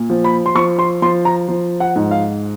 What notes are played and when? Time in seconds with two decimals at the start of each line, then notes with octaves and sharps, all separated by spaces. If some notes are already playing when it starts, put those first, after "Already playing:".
Already playing: A#2
0.10 F3
0.24 B5
0.46 C6
0.55 F3 C#6
0.79 C6
1.02 F3 C6
1.25 A#5
1.48 F3
1.80 F#5
1.96 G#2
2.11 F5